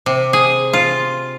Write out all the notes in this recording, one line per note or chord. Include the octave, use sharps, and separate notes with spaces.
C3
G#4
F4